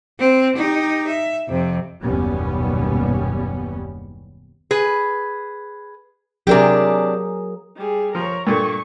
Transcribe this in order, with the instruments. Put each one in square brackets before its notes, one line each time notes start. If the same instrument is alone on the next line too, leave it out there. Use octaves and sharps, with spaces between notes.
[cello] C4
D#4 G4
E5
F2 C3
[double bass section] F#1 D#2 B2 G3 B3 C#4
[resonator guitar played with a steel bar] G#4 B4
[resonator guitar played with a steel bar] C3 D4 G4 [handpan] F#3 G#4 A#4
[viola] G3 G#4
[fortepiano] F3 [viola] A#4 C#5
[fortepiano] G2 A#2 A3 [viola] C#6